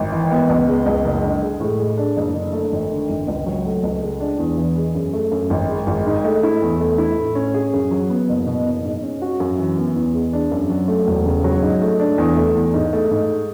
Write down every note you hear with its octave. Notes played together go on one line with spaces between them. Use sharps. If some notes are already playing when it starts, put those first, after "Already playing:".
Already playing: G#1
E3
B3
C#2
G#3
C#2
F#1
D3
G#3
A2
G#3
D4
F#1
D3
A3
G#1
D3
G#1
C#2
F#3
A3
C#2
G#3
D4
E2
E3
G#3
F#2
A3
F#2
G#1
G#3
G#1
G#2
A3
E4
E2
A3
E4
A2
C#4
G#4
F#2
F#3
B3
F#1
B2
F#1
G#2
C#4
F#4
F#2
E3
B3
E2
G#3
D4
F#2
F#3
A3
E1
C#3
F#3
G#2
A3
D4
E2
A3
E2
G#2
A3
G#2